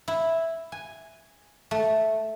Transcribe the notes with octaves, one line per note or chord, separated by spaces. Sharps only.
E4
G#5
A3